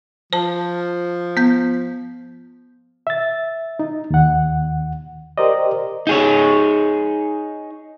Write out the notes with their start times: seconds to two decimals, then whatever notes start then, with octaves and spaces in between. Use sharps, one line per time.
0.33 F3 C5 A5
1.37 B3 G6
3.07 E5 A6
3.79 D#4
4.10 D#2 F#5
5.38 G4 A#4 C5 D5 D#5
6.07 D#4 G#4 C#5